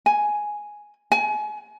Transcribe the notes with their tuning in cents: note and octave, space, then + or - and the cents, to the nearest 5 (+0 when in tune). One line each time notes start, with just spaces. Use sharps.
G#5 +5
G#5 +35